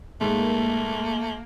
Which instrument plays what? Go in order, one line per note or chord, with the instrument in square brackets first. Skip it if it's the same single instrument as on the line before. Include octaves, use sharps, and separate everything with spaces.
[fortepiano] G#2 [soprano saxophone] A3 [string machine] A#3